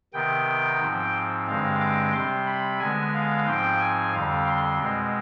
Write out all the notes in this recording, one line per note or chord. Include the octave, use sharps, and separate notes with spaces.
C3 D#3 B3 G5
G#2 F3 C4
G2 D3 G#3 C4 F5
D6
C3 G3 C4 C6
B5
D3 G#3 B3 G#5
F5
G#2 F3 C4 G5
G#5
F2 D3 G3 C4 F5
C6
B2 G#3 C4